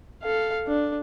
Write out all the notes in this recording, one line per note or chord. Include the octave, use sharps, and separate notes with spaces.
A4 F5
D4